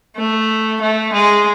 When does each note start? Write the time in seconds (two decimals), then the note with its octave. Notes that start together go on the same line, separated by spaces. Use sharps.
0.17 A3
0.81 A3
1.13 G#3